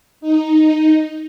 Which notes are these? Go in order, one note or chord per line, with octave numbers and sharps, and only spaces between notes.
D#4